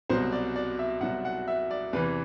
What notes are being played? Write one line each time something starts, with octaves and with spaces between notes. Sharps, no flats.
C2 B2 F#3 C5
D5
D5
E5
C2 B2 F#3 F#5
F#5
E5
D5
E2 C3 E3 B4